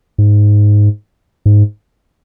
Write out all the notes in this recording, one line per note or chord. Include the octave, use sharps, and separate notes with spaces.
G#2
G#2